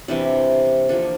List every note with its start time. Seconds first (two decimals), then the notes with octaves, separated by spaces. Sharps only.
0.08 C3 E3 G3 D4
0.89 D3 F3 A#3 D4